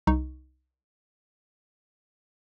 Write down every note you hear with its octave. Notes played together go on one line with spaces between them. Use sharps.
C2 D#4 C#6